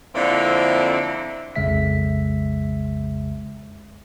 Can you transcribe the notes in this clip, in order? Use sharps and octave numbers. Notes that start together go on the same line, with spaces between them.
F2 D3 A#3 C4 E4 D5
B1 F2 C#3 G#3 E5 B6